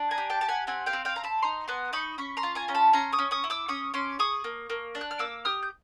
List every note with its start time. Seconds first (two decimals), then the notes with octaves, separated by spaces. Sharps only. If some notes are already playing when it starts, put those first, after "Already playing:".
Already playing: D4
0.11 G#5 A#5
0.18 G4
0.30 G5 A5
0.41 G4 A5
0.48 F#5 G#5
0.67 C4 F#5 G#5
0.86 F5 G5
0.93 C4
1.05 F5 G5
1.16 C4 A#5
1.24 A5 B5
1.42 D#4 A#5 C6
1.68 B3 A#5 C6
1.93 D#4 B5 C#6
2.18 C#4 B5 C#6
2.37 A#5 C6
2.43 F4
2.55 G#5 A#5
2.68 C#4 A#5
2.75 A5 B5
2.93 C#4 A#5 C6
3.12 C#6 D#6
3.19 C#4
3.31 C#6 D#6
3.44 E4
3.50 D6 E6
3.68 C#4 C#6 D#6
3.94 C#4 C6 D6
4.19 G#4 C#6 D#6
4.44 A#3
4.70 A#3
4.95 D4
5.01 F#6
5.11 F6
5.19 A#3 D6 E6
5.45 G4 D#6 F6
5.62 G6